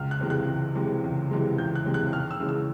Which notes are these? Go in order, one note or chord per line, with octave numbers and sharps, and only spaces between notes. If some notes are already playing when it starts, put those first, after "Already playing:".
Already playing: C#2 F6
F#6
C3 E3 G#3
F#6
C#2
C3 E3 G#3
C#2
C3 E3 G#3
C#2 G6
F#6
C3 E3 G#3
F#6
D#2 F6
E6
C#3 E3 G#3
E6